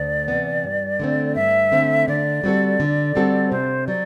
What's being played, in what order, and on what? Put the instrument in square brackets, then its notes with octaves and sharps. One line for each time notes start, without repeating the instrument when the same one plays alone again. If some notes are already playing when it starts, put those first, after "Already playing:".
Already playing: [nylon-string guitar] D2 [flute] D5
[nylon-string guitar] C3 E3 B3
G2
D3 A3 C4
[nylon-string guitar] G2 [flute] E5
[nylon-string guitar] D3 A3 C4
[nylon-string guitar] D3 [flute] D5
[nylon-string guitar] G3 C4 F#4 A4
D3
G3 C4 F#4 A4
[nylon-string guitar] C3 [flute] C5
[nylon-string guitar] F#3 [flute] D5